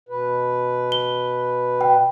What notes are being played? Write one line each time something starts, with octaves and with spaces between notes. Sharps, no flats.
B2 B4
G7
G5